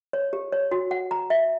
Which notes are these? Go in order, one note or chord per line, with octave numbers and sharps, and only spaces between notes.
C#5
G4
C#5
F#4
F#5
A#5
E5